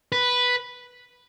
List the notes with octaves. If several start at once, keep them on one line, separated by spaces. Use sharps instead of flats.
B4